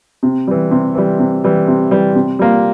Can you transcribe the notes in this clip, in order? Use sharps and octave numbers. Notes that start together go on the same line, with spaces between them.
C3
E3 G3
C3
E3 G3
C3
E3 G3
C3
E3 G3
C3
G3 A#3 F4